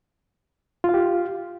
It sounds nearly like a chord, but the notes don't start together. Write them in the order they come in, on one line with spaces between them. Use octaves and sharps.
F4 F5 G4